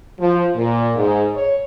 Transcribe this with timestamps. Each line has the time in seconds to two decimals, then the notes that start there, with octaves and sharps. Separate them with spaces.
0.19 F3
0.55 A#2
0.96 G#2
1.34 C#5